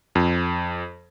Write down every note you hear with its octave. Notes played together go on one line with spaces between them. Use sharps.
F2